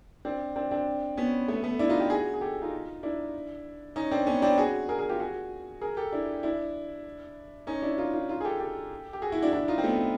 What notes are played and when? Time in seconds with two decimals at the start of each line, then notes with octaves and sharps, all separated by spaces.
0.25 C4 D4
0.56 C4 D4
0.71 C4 D4
1.17 B3 C#4
1.48 A3 B3
1.64 A3 B3
1.79 D4 E4
1.89 D#4 F4
2.00 F4 G4
2.10 F#4 G#4
2.34 G#4
2.41 G4 A4
2.62 D#4 F4
3.03 D4 E4
3.96 C#4 D#4
4.11 C4 D4
4.26 B3 C#4
4.42 C4 D4
4.58 F#4 G#4
4.89 G#4 A#4
4.99 G#4 A#4
5.09 F4 G4
5.20 F#4 G#4
5.82 G#4 A#4
5.97 G4 A4
6.12 D4 E4
6.43 D4 E4
7.67 C#4 D#4
7.82 D4 E4
7.98 D#4 F4
8.13 D#4 F4
8.29 D#4 F4
8.41 G#4
8.44 G4 A4
8.60 G4 A4
9.13 G4
9.22 F#4 G#4
9.32 E4 F#4
9.42 D4 E4
9.53 D4 E4
9.68 D#4 F4
9.78 C4
9.84 A3 B3